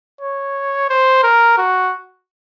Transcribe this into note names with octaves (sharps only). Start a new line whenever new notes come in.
C#5
C5
A#4
F#4